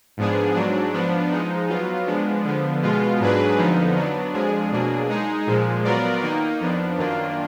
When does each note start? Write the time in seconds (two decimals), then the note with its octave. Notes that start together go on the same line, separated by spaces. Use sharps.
0.17 G#2 F3 B3 D4 G#4
0.55 G#2 F#3 D4
0.93 F3 B3 D4
1.31 F3 G#3 D#4
1.69 F#3 B3 F4
2.06 F3 G#3 B3 D4
2.44 D3 F3 B3
2.82 B2 G#3 B3 F4
3.20 G#2 F#3 D4 G#4 B4
3.58 F2 D3 F3 B3 D#4
3.95 F#3 B3 D4
4.33 F2 F3 G#3 D4 G#4
4.71 B2 F#3 A#3 D4 G#4
5.09 G#3 D#4 G#4
5.47 A#2 F3 G#3
5.84 F#3 B3 F4 A#4 D5
6.22 D#3 A#3 D#4
6.60 F2 F3 B3 D4
6.98 F#2 D#3 A#3 D4 F4